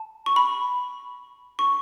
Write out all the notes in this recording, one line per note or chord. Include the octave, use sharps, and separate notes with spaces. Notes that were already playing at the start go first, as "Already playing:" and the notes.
Already playing: A5
C#6
B5
C#6